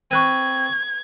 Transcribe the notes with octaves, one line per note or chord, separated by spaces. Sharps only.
C4 B4 C#6 F#6 G#6 D#7